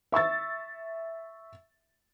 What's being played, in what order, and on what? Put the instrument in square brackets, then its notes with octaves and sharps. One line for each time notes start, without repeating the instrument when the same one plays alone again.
[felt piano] E5 C#6 E6 A6